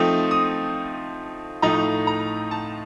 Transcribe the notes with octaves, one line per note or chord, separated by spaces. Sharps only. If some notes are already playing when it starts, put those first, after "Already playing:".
Already playing: F3 A3 C4 D#4 D#6
D#6
A2 F3 A3 D#4 A#5
A#5
A5